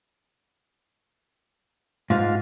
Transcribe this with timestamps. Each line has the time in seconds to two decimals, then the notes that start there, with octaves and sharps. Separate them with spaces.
2.10 G#2 F4